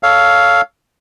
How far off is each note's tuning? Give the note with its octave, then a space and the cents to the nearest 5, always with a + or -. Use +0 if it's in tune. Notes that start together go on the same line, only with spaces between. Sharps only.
A4 +0 C#5 +20 F5 +0